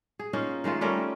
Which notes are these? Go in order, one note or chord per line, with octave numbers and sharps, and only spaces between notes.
G#4
A#3 C#4 D#4 F4
D#3 G#3 A3 F4
G3 A3 C#4 A#4